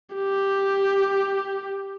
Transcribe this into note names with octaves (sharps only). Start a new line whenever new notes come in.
G4